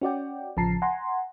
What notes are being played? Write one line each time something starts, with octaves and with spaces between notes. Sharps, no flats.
C#4 F#4 D5 G5
A1 C#3 F3 A5 A#5 C7
F#5 G#5 A#5 C6